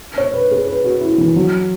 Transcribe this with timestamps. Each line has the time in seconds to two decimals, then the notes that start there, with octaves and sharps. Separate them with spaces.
0.18 C#5
0.34 B4
0.51 G#4
0.67 B4
0.84 F#4
1.01 E4
1.18 E3
1.36 F#3